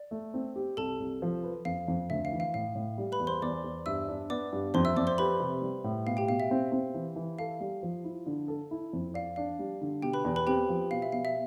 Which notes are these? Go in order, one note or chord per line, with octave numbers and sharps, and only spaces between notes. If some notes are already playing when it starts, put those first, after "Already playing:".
Already playing: D5
A3
C4
G4
C2 A4 A5
C2
F3
B4
F2 F5
F2
D2 E5
F5
E3
F5
A2 F5
A2
G3
B4 B5
E2
C5 C6
E2 D5 D6
E2
G2 E5 E6
D4
B3 D5 D6
G2
F2 C5 C6
E5 E6
F2 D5 D6
C5 C6
G4 B4 B5
C3
G3
A2
B2 F5
G4 G5
B2 F5
E5
C4
C4
E3
E3
A4 F5
G3
F3
E4
D3
A4
E4
F2
D5 F5
D4 F5
G3
D3
B2 G4 G5
B4 B5
E2
B4 B5
C4 G4 G5
F3
B2 F5
E5
B2 F5
E5